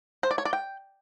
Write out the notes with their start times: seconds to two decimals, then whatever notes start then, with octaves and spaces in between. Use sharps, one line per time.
0.23 C5
0.31 D5
0.38 C#5
0.45 D5
0.53 G5